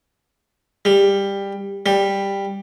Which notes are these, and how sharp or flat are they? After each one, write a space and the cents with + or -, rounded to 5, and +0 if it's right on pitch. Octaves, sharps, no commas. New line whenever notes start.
G3 +15
G3 +10